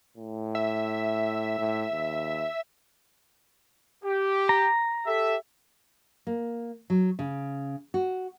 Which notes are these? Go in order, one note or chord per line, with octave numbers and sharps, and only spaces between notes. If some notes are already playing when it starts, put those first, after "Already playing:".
A2
E5
A2
D#2
G4
A#5
G4 A4 E5
A#3
F#3
C#3
F#4